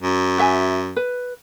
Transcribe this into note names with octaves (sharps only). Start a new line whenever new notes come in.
F#2
F#4 E5 G#5
B4